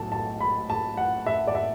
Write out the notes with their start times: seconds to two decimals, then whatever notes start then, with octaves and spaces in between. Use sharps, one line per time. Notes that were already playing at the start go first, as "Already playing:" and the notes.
Already playing: B1 A2 F#3 A4 A5
0.12 A5
0.40 B5
0.70 A5
0.97 F#5
1.26 E5
1.47 D5
1.55 E5